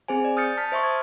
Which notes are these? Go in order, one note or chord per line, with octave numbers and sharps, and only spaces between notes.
C4 G#4 C5 G#5
D5
D#6 F6 G6 A6 C#7
A5 F6 A6 B6
C5 E5 C6 C#6
D#6 G#6